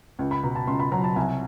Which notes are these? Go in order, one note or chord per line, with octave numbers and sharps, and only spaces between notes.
C#2
B5
B2 A#5
A5
C#2 C6
B5
F#3 A#5
A5
C2 G#5